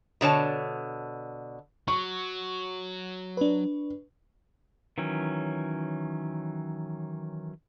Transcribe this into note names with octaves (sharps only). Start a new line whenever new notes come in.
B2 D3 C#5 A5
F#3 C#6
D4 B4
D#3 E3 F#3 C#4